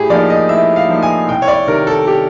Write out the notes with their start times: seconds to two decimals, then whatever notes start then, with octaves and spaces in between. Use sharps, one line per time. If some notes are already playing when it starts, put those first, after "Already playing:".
Already playing: A2 G4 G#4
0.10 F3 A#3 D#4 D5
0.30 D#5
0.49 A2 E5
0.76 F5
0.89 F3 A#3 D#4
1.02 G#5
1.28 C2 G5
1.42 C#5
1.48 D5
1.68 C3 D#3 A#4
1.87 A4
2.07 G4